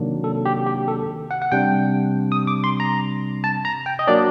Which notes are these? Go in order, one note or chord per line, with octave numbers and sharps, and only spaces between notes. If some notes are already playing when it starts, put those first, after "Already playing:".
Already playing: C3 D#3 F#3 A#3 D4
A4
G4
G4
A4
F#5
F#5
C3 G3 D4 G5
D#6
D6
C6
A#5
A5
A#5
G5
D#5
F#3 A#3 D4 D5